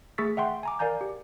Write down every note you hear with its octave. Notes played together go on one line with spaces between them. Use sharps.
A3 G#4 C#6 E6 A6 B6
E5 F#5 G5 C6
G#5 A#5 D6
A#4 D5 F5 G#5 A#5 G6
G4